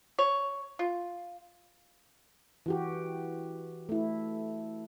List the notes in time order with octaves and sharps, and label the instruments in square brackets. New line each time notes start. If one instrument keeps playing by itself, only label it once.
[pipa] C#5
F4
[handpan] E3 F#4 G4
A3 E4